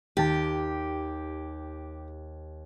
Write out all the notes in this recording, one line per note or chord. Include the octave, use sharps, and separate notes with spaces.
D#2 G4 A5 A6